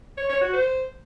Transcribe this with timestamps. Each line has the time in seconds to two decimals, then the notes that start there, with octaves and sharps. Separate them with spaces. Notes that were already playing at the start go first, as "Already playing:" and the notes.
0.18 C#5
0.29 C#5
0.41 F#4
0.53 C5